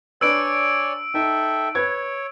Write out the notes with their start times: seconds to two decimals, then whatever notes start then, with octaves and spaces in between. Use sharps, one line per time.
0.21 D4 B4 C#5 D5 G#5 E6 D7
1.14 D#4 A4 E5 G5
1.75 B4 C#5 G#6